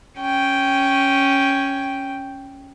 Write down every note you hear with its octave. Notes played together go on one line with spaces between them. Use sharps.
C#4 G5